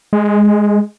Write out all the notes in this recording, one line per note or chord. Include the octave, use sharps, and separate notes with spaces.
G#3